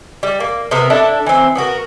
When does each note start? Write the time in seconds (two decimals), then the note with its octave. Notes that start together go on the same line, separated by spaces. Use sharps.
0.23 G3
0.40 A#3
0.71 C3 B3 A#4
0.90 D4 E4 A4
1.26 E3 C4
1.55 B3 D4 F#4 A#4